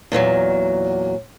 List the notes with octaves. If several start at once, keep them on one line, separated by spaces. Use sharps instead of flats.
E2 A#2 D#3 F#3